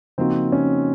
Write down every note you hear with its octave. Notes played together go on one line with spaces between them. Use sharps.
C#3 F3 A#3 C4 D#4 F#4
C#4